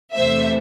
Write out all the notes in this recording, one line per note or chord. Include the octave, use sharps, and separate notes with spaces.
E2 C3 E3 A3 C5 E5